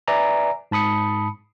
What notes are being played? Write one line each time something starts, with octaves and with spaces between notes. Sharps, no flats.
B4 D5 E5 G#5 A#5
G#2 A5 B5 D#6 C#7